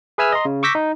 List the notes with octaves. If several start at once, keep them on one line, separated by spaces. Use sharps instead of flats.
G#4 B4 E5 G#5 E6 F6
D#5 A#5 C6
C#3
C#6 D6 E6 G6 A#6 B6
D#4